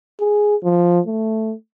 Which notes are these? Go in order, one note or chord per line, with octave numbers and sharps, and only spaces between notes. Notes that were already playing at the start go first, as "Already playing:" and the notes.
G#4
F3
A3